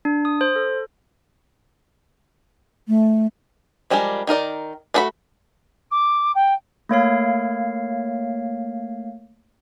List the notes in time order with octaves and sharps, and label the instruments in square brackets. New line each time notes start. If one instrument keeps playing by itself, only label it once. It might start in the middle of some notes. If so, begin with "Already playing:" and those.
[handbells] D4
D#6
C5
A4
[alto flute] A3
[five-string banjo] F3 G3 G#3 D4 A#4
D#3 D#4 A#4 D5
A3 D4 F#4 A4 B5
[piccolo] D6
G5
[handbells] A3 A#3 C#5 F5